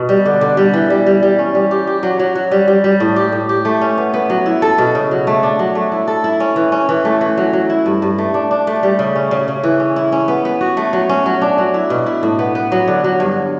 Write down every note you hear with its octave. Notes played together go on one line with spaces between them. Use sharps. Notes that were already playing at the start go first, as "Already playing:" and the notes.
Already playing: B2
G3
D3
D3
G3
E3
G3
G3
G3
C#4
G3
G4
G4
F#3
F#3
F#3
G3
G3
G3
A2
G4
A2
G4
A3
C#4
B3
B3
F#3
E4
A4
B2
C#3
F#3
A3
D4
F#3
A3
E4
A4
E4
C#4
E3
C#4
E3
A3
E3
F#3
F#3
E4
G2
G2
A3
D4
D4
A3
G3
C#3
C#4
C#3
C#3
E3
C#4
E4
C#4
B3
B3
F#4
A3
F#3
C#4
F#3
D4
F#3
E4
B2
E4
A2
B3
B3
F#3
D3
F#3
G2